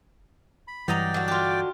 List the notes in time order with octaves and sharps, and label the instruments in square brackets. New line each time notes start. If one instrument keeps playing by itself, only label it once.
[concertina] B5
[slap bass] G2 E3 [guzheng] F#3 D#5 A#5 [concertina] D5 G5 D6
[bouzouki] D3 F#4
[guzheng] F4 G4